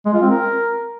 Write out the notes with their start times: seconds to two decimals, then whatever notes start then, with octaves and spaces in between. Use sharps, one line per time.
0.06 G#3
0.14 F4
0.22 C4
0.30 A#4